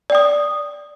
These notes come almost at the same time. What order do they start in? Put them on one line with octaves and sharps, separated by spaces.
D5 G5 D#6